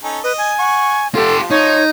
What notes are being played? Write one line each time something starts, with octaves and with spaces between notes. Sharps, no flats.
C#4 D#4 A4
B4 D#5
G#5
F#5 C#6
F3 F4 G4 A4
D#4 C#5